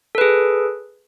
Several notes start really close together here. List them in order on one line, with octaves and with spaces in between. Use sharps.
A4 B4 G#4